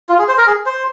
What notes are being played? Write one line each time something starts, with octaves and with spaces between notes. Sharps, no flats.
F4
G#4
C5
A#4
G#4
C5